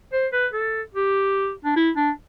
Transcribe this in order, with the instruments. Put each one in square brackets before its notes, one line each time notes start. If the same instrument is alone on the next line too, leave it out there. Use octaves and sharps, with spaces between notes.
[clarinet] C5
B4
A4
G4
D4
E4
D4